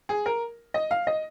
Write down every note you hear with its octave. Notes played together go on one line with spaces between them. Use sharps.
G#4
A#4
D#5
F5
D#5